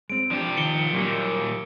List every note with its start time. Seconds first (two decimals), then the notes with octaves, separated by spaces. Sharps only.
0.10 G#3 C4 D7
0.31 F3 D4 G4
0.57 D#3 C#7 G7
0.93 A#2 D#3 F#3 G3 A#3